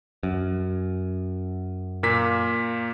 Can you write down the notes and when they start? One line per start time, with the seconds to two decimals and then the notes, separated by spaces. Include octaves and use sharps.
0.23 F#2
2.03 A#2 A#3 B6